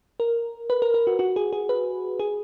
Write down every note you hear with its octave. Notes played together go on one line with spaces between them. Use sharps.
A#4
B4
A#4
A#4
F#4
F#4
G#4
G#4
B4
G#4